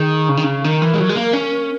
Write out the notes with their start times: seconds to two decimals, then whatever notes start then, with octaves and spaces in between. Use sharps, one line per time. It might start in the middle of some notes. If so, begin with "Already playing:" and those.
Already playing: D#3 G#4
0.29 C#3
0.37 D#3
0.44 C#3
0.64 D#3 A#4
0.82 E3
0.94 G#3
0.99 F#3
1.09 G#3
1.16 A#3
1.33 C#4